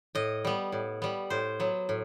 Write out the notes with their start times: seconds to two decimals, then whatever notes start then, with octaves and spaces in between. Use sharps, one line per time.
0.15 A2 D#5
0.45 G3 B3
0.72 A2
1.02 G3 B3
1.30 A2 C5
1.60 F#3 B3
1.89 A2